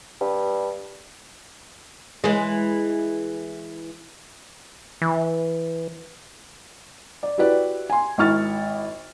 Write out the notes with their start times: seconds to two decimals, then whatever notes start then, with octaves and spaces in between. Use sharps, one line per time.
0.21 G2
2.24 E3 G#3
5.02 E3
7.23 D5
7.38 E4 F#4 G4 B4 D5
7.90 G#5 C6
8.18 G#1 E4 C#6 F6 A6